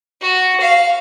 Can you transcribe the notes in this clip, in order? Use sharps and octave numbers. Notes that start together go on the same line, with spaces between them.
F#4
F5